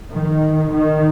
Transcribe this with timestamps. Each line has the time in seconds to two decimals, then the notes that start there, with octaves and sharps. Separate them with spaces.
0.11 D#3
0.72 D#3